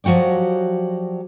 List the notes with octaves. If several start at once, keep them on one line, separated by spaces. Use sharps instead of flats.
F3 F#3 F#4 G4 D5